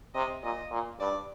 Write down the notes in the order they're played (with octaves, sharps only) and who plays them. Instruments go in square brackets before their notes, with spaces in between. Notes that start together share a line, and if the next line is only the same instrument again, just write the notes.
[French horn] C3 [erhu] D#5
[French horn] A#2 [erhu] D#5
[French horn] A#2
[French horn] G2 [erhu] D5